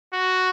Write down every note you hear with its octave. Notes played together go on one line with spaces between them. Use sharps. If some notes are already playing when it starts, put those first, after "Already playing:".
F#4